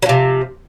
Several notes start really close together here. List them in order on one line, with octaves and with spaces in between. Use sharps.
F#3 F3 C3